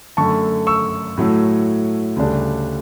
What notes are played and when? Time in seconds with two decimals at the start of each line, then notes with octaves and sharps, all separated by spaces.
0.17 F#2 D3 A3 A5 C#6
0.67 C#6 E6
1.17 A2 F#3 A3
2.16 D2 C#3 G3 D4